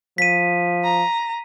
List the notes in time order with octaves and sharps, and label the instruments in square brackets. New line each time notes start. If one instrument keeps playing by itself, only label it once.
[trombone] F3 [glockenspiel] B6 D#7
[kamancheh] A#5